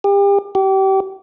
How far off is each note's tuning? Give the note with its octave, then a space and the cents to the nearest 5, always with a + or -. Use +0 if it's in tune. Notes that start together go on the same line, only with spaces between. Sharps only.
G4 +35
G4 -30